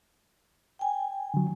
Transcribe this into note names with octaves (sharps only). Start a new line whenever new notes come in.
G5 G#5
D3 F#3